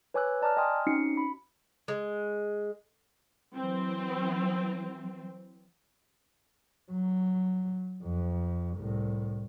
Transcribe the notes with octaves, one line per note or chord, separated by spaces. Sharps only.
B4 C#5 G#5 D6 E6 F#6
D5 A5 A#5 D6 F6
D#5 G5 G#5 C6 D#6 F6
C4 C#4 D#4 F#4 C7 C#7
B5
G#3
E3 F#3 C4
F#3
F2
C2 A2